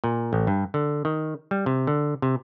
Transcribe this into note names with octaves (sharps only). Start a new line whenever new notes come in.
A#2
A1
G2
D3
D#3
G3
C3
D3
C3